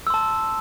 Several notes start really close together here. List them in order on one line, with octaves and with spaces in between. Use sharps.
E6 C6 A5